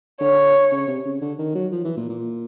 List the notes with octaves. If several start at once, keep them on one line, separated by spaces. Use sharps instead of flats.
D3 C#5
C#3
C3
C#3
D3
D#3
F#3
F3
E3
A#2
A#2